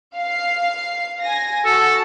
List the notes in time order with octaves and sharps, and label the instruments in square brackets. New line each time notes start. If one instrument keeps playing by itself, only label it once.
[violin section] F5 C7
G#5 A#6
[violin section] F#4 A5 [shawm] A4